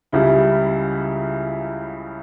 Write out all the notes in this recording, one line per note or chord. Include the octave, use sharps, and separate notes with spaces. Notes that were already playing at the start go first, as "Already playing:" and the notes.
C#2 C#3 G3 E4